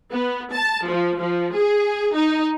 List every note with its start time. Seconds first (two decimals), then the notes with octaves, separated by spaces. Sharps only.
0.11 B3
0.53 A5
0.87 F3
1.19 F3
1.54 G#4
2.14 D#4